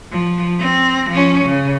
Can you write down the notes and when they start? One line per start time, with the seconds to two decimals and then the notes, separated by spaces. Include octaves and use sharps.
0.11 F3
0.59 C4
1.10 F3 C#4
1.45 C#3